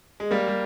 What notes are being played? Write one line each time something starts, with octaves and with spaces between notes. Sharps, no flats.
G#3
G3 A#3
G3